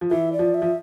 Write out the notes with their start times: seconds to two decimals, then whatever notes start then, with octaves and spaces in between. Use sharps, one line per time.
0.01 F3
0.11 E3 E5
0.33 D5
0.39 F3
0.54 E5
0.62 F3